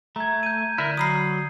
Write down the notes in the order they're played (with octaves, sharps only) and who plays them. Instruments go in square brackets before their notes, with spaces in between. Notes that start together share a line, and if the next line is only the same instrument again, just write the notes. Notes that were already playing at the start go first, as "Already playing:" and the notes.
[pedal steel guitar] A3 [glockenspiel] A#5 G#6
[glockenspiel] G6 D#7
[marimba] D3 [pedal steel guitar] E4 A#4
[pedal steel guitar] F#3 [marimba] A#5 B5 F6 [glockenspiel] D#6 C7